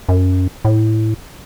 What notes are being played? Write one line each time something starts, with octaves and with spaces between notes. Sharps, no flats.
F#2
A2